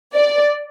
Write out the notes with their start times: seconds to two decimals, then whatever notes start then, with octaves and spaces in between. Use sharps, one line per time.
0.14 D5